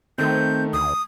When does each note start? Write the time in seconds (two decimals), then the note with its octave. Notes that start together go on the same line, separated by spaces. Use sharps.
0.18 D#3 A3 C4 G6
0.73 D2 D#6